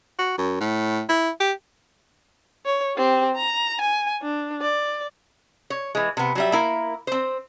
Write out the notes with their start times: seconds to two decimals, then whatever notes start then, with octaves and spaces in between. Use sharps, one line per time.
0.19 F#4
0.38 F#2
0.61 A2
1.09 E4
1.40 G4
2.66 C#5
2.96 C4 G4
3.36 A#5
3.81 G#5
4.22 D4
4.61 D5
5.70 C#5
5.95 E3 G#3
6.17 C3 B3
6.35 F#3 G3 E5
6.52 A#3 E4 A#4
7.07 C4 C5